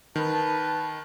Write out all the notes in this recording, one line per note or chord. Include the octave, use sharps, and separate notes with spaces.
D#3 B4 A5